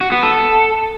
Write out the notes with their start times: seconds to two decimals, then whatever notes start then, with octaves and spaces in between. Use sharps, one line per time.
0.01 F#4
0.12 B3
0.23 A4